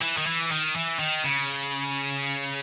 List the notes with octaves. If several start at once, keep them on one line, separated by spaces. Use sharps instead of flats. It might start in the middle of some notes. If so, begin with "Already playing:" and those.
E3
D#3
E3
D#3
E3
D#3
C#3